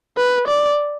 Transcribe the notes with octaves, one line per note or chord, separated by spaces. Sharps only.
B4
D5